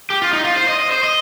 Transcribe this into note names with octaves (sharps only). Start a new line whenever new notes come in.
G4
F4
D#4
F4
C5
D#5
D#5
C5
D#5